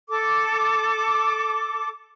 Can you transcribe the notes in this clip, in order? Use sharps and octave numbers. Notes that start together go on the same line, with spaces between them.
A4 D6